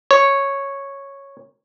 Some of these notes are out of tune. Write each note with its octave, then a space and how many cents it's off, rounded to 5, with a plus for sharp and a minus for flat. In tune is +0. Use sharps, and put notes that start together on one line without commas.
C#5 -5